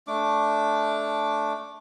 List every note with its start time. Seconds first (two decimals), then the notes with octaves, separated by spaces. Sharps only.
0.07 A3 D4 D6